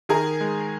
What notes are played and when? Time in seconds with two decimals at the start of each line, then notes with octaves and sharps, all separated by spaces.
0.09 D#3 G#4 A#4
0.41 G#3